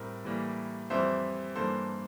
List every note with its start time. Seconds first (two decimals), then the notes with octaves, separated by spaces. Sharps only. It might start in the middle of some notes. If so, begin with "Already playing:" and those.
Already playing: A2 G3 C4 A#4
0.25 A2 E3 G3 A#3
0.90 F2 E3 G3 C4 C5 E5
1.56 G2 E3 A#3 A4 C5